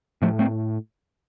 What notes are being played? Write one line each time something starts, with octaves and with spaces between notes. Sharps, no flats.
A2 F3 A3
A3 C4